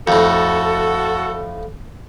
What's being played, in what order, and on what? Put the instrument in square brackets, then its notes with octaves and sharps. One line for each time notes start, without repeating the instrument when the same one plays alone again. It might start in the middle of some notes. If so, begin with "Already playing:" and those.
[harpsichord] F2 A2 [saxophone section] F#4 A4